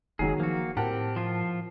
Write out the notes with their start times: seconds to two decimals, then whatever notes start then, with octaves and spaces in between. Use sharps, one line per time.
0.19 F#1 D#3 F#3 G#3 G#4
0.40 F3 A#3 F#4
0.77 A2 C4 G4 A#4 F#5 A5
1.16 F3 F4